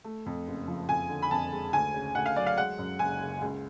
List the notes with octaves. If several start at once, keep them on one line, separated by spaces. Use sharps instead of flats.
A3
F2
F#1
F3
F2 G#5
D3
B5
F2 A5
G#3
D2 G#5
C#3
D2 F#5
F5
F#3 D5
F5
G#3 F#5
F#2
F#1 G#5
C#3
C#2